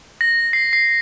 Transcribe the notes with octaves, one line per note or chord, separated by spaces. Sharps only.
A#6
C7
C7